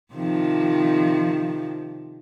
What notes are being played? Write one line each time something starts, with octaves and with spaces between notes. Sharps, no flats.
C3 D#3 F3